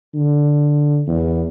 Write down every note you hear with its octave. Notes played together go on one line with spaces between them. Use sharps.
D3
E2